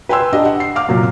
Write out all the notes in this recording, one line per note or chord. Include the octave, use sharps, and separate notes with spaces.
B4 G5 G#5 C6 E6
D4 G4 D#5
F#5
C7
F5 D6 F6
F#2 A#2 F#3